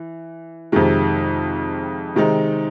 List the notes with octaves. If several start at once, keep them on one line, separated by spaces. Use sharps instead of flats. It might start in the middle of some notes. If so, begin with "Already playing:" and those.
Already playing: E3
F2 C3 D#3 G#3
C3 D#3 G#3 C4 D#4